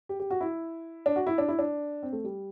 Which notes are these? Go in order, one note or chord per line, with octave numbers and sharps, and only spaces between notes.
G4
G4
F#4
E4
D4
F#4
E4
D4
E4
D4
C4
A3
G3